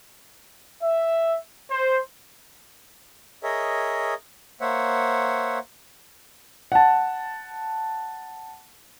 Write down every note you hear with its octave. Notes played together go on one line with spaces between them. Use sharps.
E5
C5
G#4 A#4 C#5 D#5 E5
A#3 C5 C#5 E5 F#5
F#5 A5